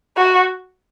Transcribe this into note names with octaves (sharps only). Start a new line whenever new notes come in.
F#4